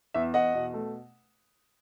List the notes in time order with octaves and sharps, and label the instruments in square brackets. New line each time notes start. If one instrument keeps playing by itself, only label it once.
[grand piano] E2 E5
E2 D#5 F#5
B2
A3